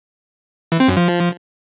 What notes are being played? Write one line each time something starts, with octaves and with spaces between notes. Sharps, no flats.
E3
C4
F#2
F3